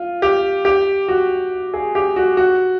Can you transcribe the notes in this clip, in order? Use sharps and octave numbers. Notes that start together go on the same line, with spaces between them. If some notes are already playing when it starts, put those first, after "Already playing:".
Already playing: F4
G4
G4
F#4
G#4
G4
F#4
F#4